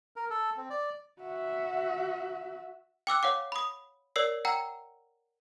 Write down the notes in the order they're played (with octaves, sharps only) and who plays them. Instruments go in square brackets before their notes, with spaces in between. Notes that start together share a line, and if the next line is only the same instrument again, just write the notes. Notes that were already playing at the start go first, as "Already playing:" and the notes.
[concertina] A#4
A4
C4
D5
[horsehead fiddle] F#4 E5
[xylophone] G5 D6 E6 F#6
C#5 F5 F#5 D6
B5 D#6
A#4 C#5 D5 E6 C7
F#5 G5 A#5 E6